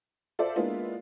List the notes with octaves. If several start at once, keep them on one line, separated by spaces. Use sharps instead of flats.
F4 A4 C5 D5 E5
G#3 A#3 B3 D4 E4 F4